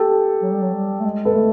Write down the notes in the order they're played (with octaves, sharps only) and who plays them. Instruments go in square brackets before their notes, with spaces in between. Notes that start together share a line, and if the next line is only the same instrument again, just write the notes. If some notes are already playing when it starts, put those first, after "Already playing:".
Already playing: [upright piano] G4 A4
[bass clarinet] F#3
G3
F#3
G3
A3
G#3
[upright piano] A4 B4
[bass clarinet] A3